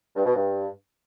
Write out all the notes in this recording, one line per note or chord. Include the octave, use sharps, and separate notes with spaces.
G2
B2
G2